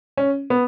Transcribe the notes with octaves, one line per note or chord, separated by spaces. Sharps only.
C#4
B3